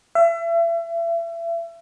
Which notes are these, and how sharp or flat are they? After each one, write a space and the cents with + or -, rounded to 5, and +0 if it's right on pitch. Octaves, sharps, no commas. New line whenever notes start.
E5 +35